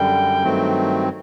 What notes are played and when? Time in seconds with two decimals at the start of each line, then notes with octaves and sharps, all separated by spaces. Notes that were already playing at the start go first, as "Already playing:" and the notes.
Already playing: F#2 D3 G3 G5
0.44 G2 D#3 F#3 A3 C4